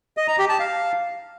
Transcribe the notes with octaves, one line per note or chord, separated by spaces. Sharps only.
D#5
A#5
G4
A5
F5